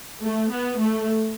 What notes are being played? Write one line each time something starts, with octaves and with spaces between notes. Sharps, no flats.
A3
B3
A3